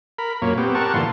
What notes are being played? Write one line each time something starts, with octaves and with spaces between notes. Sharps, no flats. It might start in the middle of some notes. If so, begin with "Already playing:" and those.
A#4 B5
F#2 A#2 A#3 C#5
B3 C4 G4
G4 A#4 F#5 A5 C#6
G2 A#2 D3 E3 F4 C6